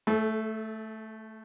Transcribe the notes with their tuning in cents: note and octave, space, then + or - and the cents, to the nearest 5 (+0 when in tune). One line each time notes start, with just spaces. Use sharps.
A3 +0 A4 -35